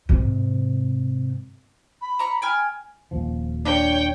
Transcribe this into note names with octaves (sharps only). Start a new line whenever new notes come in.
G#2 C3
B5
A#5 C#6
G5 G#5 F6
D#1 F3
D4 C#5 G5